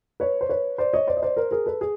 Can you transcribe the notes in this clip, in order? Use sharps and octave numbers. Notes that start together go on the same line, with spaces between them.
B4 C#5
C5
B4 C#5
C5 D5
C#5 D#5
C5 D5
D#5
C5 D5
A#4 C5
G#4 A#4
A4 B4
G#4